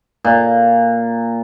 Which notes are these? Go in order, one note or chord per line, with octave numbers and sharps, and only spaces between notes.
A#2